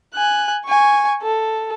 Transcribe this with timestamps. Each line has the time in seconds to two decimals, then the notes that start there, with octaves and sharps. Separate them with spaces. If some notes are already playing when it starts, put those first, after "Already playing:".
0.15 G#5 F#6
0.65 G#5 C#6
1.23 A4